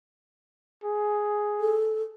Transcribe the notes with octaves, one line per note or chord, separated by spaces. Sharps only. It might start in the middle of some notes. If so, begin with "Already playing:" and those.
G#4
A4